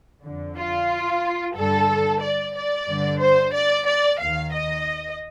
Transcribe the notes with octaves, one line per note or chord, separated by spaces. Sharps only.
F2 D3
F4
G2 D3 A4
D5
D5
G2 D3
C5
D5
D5
D#2 D#3 F5
D#5